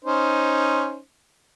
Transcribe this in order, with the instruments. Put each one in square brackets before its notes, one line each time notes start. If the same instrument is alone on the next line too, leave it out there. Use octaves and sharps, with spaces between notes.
[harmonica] C#4 D#4 C5